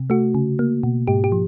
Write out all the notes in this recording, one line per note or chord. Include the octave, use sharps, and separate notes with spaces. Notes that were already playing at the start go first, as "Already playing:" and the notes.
Already playing: C3
A3 F#4
C#3
A#3
B2
G#2 G4
G4
F3